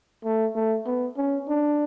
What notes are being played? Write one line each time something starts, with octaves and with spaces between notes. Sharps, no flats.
A3
A3
B3
C#4
D4